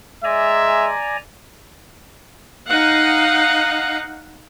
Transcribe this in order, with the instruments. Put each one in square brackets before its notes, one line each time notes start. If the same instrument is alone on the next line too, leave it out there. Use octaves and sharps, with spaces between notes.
[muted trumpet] G#3 [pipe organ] D5 G#5 A#5 [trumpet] E5
[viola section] D#4 F5 F#5